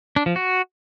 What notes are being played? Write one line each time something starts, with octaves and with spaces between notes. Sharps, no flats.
D4
F3
F#4